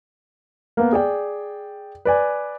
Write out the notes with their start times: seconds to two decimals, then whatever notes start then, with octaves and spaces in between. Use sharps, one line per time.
0.77 A#3 B3
0.93 G#4 D5 G5
2.05 B4 D5 G#5